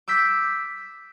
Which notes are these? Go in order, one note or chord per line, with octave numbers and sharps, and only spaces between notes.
D6 E6 G6 B6